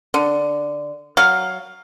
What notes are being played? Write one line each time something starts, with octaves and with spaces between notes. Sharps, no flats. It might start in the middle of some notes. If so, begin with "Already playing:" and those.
D3
F#3 F5